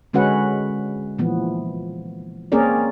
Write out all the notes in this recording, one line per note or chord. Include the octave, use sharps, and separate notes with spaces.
D3 G#3 C#4 F#4 B4 F#5
A#2 E3 F3 B3
A#3 C4 C#4 G#4 A#4 D5